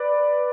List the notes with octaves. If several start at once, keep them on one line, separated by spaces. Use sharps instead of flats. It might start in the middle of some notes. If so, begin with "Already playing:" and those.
Already playing: B4 D5